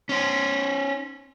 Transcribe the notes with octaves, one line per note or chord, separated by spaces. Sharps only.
C#4 C5